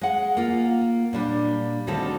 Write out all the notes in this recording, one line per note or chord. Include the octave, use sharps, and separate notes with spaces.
G#3 F#5
A#3 F4
A#2 G3 D4
D2 D#3 G3 C4 F#4 A4